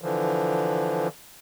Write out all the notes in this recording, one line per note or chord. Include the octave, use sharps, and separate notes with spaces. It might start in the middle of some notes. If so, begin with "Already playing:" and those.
D3 E3 F3